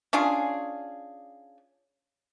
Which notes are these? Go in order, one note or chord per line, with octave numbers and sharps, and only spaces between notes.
C#4 D4 F4 G#4